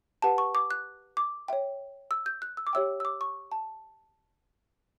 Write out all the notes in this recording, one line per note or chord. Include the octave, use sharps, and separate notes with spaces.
G4 B4 F#5 A5
C#6
D6
F#6
D6
C#5 E5 G5
E6
G6
F#6
E6
D6
G4 C#5 E5 G5 E6
E6
D6
C#6
A5